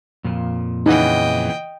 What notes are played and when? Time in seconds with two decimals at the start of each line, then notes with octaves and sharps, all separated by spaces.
0.24 F2 A#2 F3
0.86 C#3 E3 D#4 D#5 F#5 G5